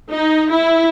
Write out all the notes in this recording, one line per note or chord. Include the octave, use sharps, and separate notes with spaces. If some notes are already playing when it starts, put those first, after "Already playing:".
D#4
E4